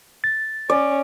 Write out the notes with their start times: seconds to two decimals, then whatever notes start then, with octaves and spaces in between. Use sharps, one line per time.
0.24 A6
0.70 C#4 D5